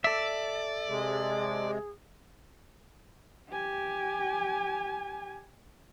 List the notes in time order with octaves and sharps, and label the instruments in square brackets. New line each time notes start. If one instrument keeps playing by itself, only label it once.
[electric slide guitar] A4 E5 [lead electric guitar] D5
[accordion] C3 G#3 [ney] G#4
[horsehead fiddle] G4 G#5